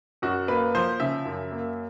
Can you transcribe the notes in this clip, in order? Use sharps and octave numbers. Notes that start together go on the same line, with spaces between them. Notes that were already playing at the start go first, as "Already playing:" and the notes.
F#2 F#4
A#3 B4
F3 C5
C#3 E5
F#2
A#3